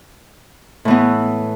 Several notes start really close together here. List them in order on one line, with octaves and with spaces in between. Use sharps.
A2 E3 B3